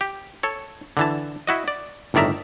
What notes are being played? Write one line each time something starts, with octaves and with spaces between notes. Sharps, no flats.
G4
A4 C#5
D3 E3 A5
E4 F#4 D#5
D5
G1 A2 D#3 D5 E5 A#5